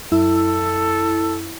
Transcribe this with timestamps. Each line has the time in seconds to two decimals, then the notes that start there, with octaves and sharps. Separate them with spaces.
0.12 F#2 E4 A4 E6